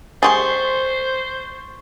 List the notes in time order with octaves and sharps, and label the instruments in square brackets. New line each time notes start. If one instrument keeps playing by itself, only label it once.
[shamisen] G#3 G4 G#4 [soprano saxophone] C5 [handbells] C6 C#6 A6